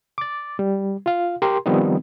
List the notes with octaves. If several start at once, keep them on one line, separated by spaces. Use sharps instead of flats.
D6 A6
G3
F4 F5
G4 A#4 C6
D#3 F3 G3 B3 C4 D#4